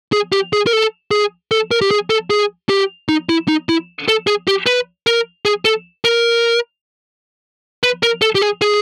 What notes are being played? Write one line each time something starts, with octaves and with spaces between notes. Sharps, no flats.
G#4
G4
G#4
A#4
A4
G#4
A4
A#4
G4
G#4
A4
G#4
G4
D#4
E4
D#4
E4
A4
G#4
G4
B4
A#4
G#4
A4
A#4
B4
A#4
A4
G4
G#4
G#4